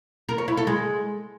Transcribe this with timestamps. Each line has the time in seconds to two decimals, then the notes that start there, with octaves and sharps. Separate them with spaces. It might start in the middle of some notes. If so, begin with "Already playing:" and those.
0.29 A#4
0.38 C#5
0.48 E4
0.57 A4
0.67 G#3